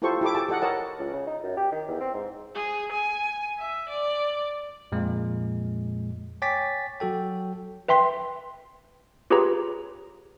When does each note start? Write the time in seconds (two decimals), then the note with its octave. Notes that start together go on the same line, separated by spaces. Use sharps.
0.02 E4 F4 G4 A4 C5 C#6
0.21 E4 G4 A4 D6
0.35 G4 G#4 A5 D6
0.49 G4 A4 D#5 F#5
0.62 A#4 C#5 D#5 F#5 A5
0.99 C#2
1.13 C#3
1.27 D#4
1.43 F#2
1.57 G4
1.72 D#3
1.88 E2
2.01 C4
2.14 G#2
2.55 G#4
2.92 G#5
3.59 E5
3.89 D5
4.92 F2 A#2 G#3
6.42 C#5 G5 G#5 D6 A6 B6
7.00 F#3 F#4 A4 G5
7.88 B4 E5 G5 C6 B6
9.30 F4 G4 G#4 B4 C#5 A#5